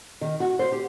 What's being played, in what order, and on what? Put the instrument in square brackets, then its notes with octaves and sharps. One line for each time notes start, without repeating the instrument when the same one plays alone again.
[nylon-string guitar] D#3
F#4
C5
G4